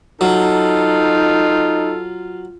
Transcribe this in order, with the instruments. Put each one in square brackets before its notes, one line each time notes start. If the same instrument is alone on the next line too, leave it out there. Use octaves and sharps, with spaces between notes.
[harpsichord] F#3 [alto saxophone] D#4 [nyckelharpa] F4 [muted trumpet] A4